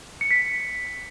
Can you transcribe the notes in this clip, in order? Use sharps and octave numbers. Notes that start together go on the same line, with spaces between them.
C#7
B6